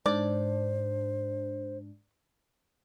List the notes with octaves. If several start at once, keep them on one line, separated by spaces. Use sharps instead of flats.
G#2 D4 C5 D5